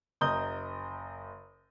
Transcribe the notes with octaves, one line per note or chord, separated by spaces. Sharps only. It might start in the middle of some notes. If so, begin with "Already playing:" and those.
F#1 D#5 A#5 D#6 G6 G7